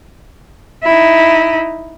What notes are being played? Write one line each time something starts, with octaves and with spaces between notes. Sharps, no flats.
D#4 E4